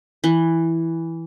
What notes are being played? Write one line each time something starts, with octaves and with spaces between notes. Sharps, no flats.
E3